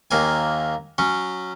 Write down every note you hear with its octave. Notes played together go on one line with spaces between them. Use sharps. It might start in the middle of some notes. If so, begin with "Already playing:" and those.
D#2 A#3 G#5
F#3 C#4